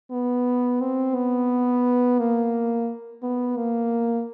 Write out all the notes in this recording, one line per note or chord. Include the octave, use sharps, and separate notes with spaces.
B3
C4
B3
A#3
B3
A#3